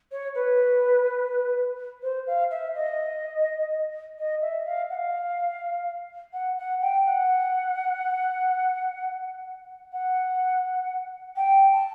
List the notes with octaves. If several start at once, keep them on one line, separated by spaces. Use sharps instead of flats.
C#5
B4
C5
F5
E5
D#5
D#5
E5
F5
F#5
F5
F#5
F#5
G5
F#5
F#5
G5
A5